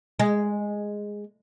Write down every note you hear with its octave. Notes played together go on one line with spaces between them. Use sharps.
G#3